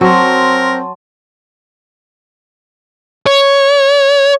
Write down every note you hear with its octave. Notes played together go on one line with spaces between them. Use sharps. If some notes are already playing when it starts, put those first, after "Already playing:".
F#3 C4 A#4 A5 C6
C#5